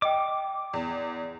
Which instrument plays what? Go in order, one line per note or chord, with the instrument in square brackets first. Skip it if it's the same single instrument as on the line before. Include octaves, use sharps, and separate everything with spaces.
[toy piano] D#5 G5 [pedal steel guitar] D6
[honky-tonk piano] E2